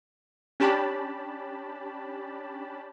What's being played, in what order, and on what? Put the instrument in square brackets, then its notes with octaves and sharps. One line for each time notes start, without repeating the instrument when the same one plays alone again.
[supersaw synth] C#4 D4 G4 A5 B5